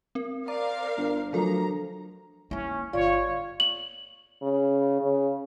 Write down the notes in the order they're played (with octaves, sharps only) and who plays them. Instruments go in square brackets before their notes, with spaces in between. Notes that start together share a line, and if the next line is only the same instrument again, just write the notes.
[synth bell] C4 A#4
[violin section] A#4 C5 F5 [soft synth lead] D5 [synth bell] A#5
[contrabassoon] G1
[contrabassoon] D2 [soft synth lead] F3 [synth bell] F#3 A4 A#4 [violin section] A#5
[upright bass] A#3 E4 [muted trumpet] C#4
[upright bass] G1 [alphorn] F4 [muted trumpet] C#5 [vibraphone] D5
[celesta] F#7
[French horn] C#3
C#3